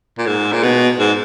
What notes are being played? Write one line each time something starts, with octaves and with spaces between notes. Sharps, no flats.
A#2
G#2
A#2
B2
G#2